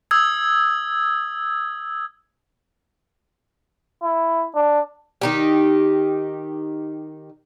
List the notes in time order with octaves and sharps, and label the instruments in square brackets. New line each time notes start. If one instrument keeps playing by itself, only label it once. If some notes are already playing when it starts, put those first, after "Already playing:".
[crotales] D#6 E6 G#6
[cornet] E4
D4
[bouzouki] D#3 D#4 G4